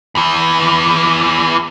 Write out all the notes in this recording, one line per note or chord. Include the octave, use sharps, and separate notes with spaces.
E2 E3